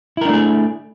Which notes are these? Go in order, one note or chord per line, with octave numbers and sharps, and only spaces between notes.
A3 D4 E4 G#4 A#4